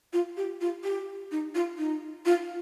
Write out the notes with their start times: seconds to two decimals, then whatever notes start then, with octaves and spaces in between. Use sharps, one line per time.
0.13 F4
0.37 G4
0.61 F4
0.84 G4
1.32 D#4
1.55 F4
1.79 D#4
2.25 F4